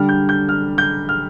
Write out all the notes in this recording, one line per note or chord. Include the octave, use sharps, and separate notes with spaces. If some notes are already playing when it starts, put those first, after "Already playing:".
Already playing: D3 G3 D4 F6
G6
G6
F6
G6
F6